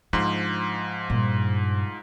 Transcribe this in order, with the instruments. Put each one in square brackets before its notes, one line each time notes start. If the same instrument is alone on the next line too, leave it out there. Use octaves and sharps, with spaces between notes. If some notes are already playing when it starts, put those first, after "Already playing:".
[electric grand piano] G#2 F3 C6 [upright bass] D4
[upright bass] G2 A#2